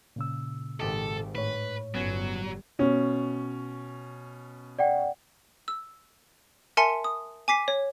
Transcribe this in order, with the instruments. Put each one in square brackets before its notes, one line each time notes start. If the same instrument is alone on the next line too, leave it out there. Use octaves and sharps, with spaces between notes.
[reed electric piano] A#2 C#3 E6
[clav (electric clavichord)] G#1 G4 D#5 [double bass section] G#2 [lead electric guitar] A4
[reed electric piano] A2 C#5 [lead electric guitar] B4
[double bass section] G1 G3 [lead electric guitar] F#3 [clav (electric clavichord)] B3 C#4
[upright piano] B2 C#4
[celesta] D5 F#5 G5
[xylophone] E6
A#4 E5 G#5 A5 C6 C#7
D#6
G#5 D6 B6 C7
C#5